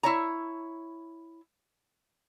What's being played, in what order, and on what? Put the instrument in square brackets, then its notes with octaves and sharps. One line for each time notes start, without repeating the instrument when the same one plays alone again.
[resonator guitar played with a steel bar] E4 C#5 A#5